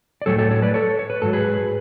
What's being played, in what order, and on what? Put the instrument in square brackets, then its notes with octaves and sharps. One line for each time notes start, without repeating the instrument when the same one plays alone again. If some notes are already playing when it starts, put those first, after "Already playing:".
[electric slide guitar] D5
A2 F#3 A4 C#5
A4 C#5
A4 C#5
B4 D5
A4 C#5
C#5
B4
G#2 F#3 A4
G#4 B4